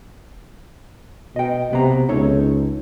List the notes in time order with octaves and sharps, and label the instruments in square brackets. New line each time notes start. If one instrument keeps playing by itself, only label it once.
[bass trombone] B2 [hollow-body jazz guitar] D#5 G5
[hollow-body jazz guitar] B1 B3 A#5 [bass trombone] C3
[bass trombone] C#2 [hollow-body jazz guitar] D#4 A4 C#5